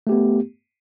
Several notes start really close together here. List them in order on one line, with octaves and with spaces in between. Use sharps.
A3 G4 B3